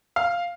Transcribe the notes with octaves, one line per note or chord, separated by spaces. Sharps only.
F5